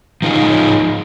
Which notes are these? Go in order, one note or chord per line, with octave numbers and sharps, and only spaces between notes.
F3 D#4 F4 G#4